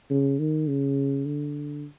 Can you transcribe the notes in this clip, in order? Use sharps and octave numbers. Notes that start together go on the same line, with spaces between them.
C#3
D#3
C#3
D3